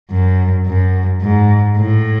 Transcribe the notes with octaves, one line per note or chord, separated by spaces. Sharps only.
F#2
F#2
G#2
A2